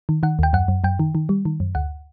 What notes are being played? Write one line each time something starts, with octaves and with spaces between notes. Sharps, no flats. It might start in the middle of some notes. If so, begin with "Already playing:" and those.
D#3
D#3 F#5
D#2 G5
F#2 F#5
F#2
F#2 G5
D#3
D#3
G3
D#3
F#2
D2 F#5